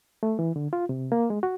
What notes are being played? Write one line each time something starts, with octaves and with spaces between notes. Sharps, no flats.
A3
E3
D3
F4
C3
A#3
G#3
F#4